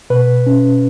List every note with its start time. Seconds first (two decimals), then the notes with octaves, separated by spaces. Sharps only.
0.10 B2 B4
0.47 C#4